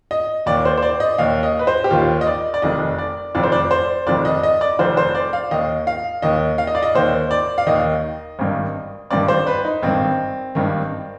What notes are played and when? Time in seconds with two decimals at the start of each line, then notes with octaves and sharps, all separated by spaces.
0.11 D#5
0.46 D#2 D#3 D5
0.65 C5
0.78 C5
0.82 D5
1.00 D#5
1.18 D#2 D#3 F5
1.43 D#5
1.59 B4
1.67 C5
1.84 G4
1.91 D#2 D#3 F4
2.21 D#5
2.27 D5
2.54 D5
2.62 F1 F2 D#3 D#5
2.98 D5
3.35 F1 F2 D#3 D5
3.43 C5
3.52 D5
3.71 C5
4.06 F1 F2 D#3 D5
4.25 D#5
4.43 D#5
4.61 D5
4.79 F1 F2 D#3 C5
4.97 C5
5.15 D5
5.33 F5
5.51 D#2 D#3 D#5
5.87 F5
6.22 D#2 D#3 D#5
6.58 F5
6.67 D#5
6.75 D5
6.83 D#5
6.94 D#2 D#3 C5
7.31 D5
7.58 F5
7.66 D#2 D#3 D#5
8.39 G#1 G2 D#3
9.11 G#1 G2 D#3 D5
9.28 C5
9.47 B4
9.65 D#4
9.82 G#1 G2 D#3 C4
10.55 G#1 G2 D#3